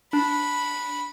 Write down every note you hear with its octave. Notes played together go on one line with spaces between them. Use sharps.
D4 B5